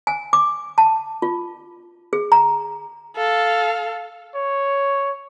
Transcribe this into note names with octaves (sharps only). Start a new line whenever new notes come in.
G#5
D6
A5
F4
G#4
A#5
A4 F5
C#5